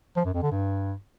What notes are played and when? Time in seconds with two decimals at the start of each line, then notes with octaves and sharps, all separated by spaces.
0.17 F3
0.25 F#2
0.34 F2
0.43 D3
0.51 G2